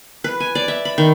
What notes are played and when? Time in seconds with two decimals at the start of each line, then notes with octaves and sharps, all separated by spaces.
0.24 B4
0.40 G#5
0.55 D5
0.68 E5
0.85 B5
0.98 D#3